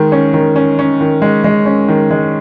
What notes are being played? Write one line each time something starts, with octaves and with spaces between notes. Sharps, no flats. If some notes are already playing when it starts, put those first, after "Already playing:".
Already playing: D#3 G#3
C#4
D#3
C#4
C#4
D#3
G#3
G#3
C#4
D#3
G#3